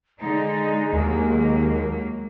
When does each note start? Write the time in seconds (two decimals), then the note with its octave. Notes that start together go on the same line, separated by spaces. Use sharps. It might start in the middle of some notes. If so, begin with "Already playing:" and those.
0.20 D3 G#3 D#4
0.93 D#2 F#3 A#3